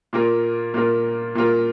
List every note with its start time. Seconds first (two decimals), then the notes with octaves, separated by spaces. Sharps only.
0.13 A#2 A#3 F4 A#4
0.74 A#2 A#3 F4 A#4
1.35 A#2 A#3 F4 A#4